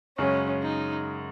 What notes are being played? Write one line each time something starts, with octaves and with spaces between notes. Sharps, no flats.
F#2 C#3 G#3 C#4
D#4